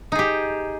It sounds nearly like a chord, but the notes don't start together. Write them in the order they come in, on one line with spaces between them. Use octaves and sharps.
D#4 G#4 G4